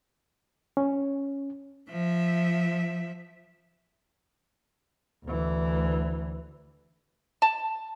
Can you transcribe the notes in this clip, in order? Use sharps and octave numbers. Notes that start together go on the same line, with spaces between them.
C#4
F3 E5
D2 E3
A5